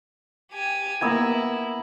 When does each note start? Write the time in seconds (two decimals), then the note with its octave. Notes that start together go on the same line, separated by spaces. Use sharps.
0.52 G4 G#5
1.01 A#3 B3 E4 A#5 E6 G#6